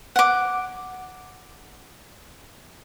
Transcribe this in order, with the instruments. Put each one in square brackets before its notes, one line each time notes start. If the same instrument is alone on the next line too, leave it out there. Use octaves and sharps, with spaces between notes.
[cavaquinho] F#5 D6